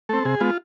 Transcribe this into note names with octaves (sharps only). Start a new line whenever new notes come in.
A3 C4 A4
C3 G#4
G#3 B3 F4